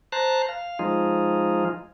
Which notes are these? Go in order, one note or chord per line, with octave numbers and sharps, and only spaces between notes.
C5 A5 A#5 F#6
F5
F3 G#3 D#4 F4